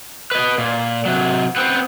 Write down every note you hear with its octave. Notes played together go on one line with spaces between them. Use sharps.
B4 D#5
A#2
C3 F#3
B3 C4